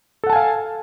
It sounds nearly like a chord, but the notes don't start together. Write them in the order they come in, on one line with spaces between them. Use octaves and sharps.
A4 F#5 A5 G#5 F5